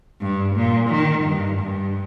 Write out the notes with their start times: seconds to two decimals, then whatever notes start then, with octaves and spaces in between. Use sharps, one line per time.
0.21 G2
0.56 A#2
0.90 D#3
1.25 G2
1.59 G2